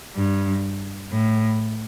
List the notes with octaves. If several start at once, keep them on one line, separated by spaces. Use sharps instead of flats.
G2
A2